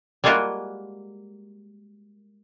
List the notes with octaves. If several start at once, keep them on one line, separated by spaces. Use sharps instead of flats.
G3 G#3 A#3 F4 F#4 A#4